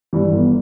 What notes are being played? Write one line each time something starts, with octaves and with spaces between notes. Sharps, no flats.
G2 E3
G1